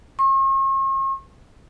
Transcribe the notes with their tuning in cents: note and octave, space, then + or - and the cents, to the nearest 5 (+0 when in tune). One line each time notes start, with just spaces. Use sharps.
C#6 -45